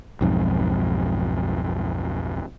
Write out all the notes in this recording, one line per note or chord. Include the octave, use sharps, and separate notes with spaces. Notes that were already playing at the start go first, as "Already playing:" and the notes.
B1 F2 G#2